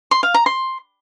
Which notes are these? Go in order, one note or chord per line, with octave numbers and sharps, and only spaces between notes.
C6
F5
A#5
C6